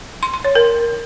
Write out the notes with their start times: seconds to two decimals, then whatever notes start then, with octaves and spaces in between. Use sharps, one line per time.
0.23 C6
0.34 C6
0.45 C#5
0.55 A#4